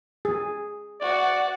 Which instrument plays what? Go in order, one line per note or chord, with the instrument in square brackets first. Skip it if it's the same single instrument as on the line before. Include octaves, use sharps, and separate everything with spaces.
[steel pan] G#4
[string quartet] F#4 F#5 [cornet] D5